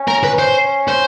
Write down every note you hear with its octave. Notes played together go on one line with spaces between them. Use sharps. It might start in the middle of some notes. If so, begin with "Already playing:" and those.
Already playing: C#4
A#4
B4
C5
C5